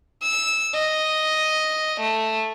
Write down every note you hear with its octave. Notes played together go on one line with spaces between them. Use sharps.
E6
D#5
A3